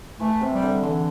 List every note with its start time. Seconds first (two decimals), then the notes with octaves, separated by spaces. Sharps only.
0.20 E3 A3
0.41 C3
0.51 G3
0.62 D3
0.83 D3 E3